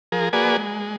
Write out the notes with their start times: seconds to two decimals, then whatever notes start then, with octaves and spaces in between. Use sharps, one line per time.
0.12 F3 G#4 A#4
0.33 A#3 F#4 G#4 B4 D5 G#5
0.57 G#3